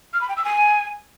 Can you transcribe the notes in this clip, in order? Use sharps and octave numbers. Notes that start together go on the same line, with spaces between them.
F6
B5
G5
E6
G#5